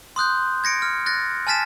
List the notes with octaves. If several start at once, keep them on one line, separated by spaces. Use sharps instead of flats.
C6 D#6 F#6 G6
G#6 A#6 C#7 D7
F6
F#6 A6 A#6
G#5 A5 F6 A6 B6 E7